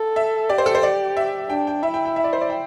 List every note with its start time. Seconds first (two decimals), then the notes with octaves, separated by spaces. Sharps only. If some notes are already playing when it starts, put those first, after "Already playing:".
Already playing: A4
0.16 E5
0.49 G4 D5
0.58 C5
0.66 A4
0.75 C5
0.83 D5
1.17 E5
1.50 D4 G5
1.67 G5
1.82 E4 E5
1.94 G5
2.05 G5
2.16 E5
2.24 D5
2.33 C5
2.41 D5
2.49 G5